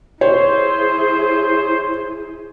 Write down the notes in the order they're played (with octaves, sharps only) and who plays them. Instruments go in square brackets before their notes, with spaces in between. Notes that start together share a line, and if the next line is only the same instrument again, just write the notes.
[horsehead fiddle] E4 G#4 [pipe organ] C5 [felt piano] C#5